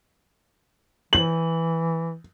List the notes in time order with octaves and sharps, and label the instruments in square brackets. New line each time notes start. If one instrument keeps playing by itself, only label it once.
[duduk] E3 [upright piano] F#7